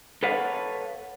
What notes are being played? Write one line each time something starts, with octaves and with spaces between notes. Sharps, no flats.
A4 B4 C#5 F5 F#5